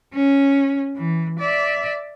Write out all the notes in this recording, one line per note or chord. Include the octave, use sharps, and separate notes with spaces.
C#4
E3
D5 E5